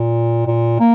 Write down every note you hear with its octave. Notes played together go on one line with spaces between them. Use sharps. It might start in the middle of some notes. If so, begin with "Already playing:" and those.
Already playing: A#2
A#2
A#3